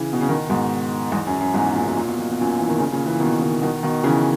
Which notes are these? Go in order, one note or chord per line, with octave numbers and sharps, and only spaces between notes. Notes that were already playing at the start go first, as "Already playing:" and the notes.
Already playing: C#3 E3
B2
C#3
B2 D#3
G#2 B2
E2 G#2
F#2
F#2
E2 G#2
A#2
B2
A#2
B2
A#2
B2
F#2 A#2
E3
D#3
A#2 C#3
A#2 C#3
C#3 E3
B2 D#3
B2 D#3
B2 D#3
B2 D#3
C#3 E3